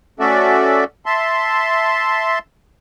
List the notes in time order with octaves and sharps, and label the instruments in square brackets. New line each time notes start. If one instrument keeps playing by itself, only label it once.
[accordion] A3 C#4 F#4 A4 D5 E5
E5 A5 C6